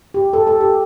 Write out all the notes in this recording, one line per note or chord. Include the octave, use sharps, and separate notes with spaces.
G4
A4
A4
G4